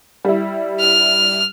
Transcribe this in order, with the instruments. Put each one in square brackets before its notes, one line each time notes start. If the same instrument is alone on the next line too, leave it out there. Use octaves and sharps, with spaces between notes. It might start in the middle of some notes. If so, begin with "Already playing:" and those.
[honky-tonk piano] G3 E4
[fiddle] F6